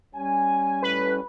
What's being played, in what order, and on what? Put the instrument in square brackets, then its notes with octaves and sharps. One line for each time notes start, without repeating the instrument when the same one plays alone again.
[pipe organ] G3 C#4 [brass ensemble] G#5
[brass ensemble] A2 [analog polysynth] B4